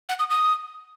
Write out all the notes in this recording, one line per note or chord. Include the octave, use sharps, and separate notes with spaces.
F#5
D#6
D#6